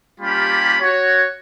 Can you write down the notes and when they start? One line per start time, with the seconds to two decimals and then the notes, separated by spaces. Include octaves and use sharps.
0.20 G3 A#3 C#4 F4 G4 B5
0.81 F#4 C#5